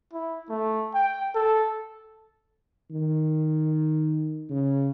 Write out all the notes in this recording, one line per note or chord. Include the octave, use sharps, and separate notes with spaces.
E4
A3
G5
A4
D#3
C#3